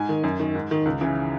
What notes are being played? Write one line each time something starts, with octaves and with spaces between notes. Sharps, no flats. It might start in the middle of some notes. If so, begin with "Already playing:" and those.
Already playing: G#2 G#5
D#3
F#2
D#3
G#2
D#3
C#2
C#3 E3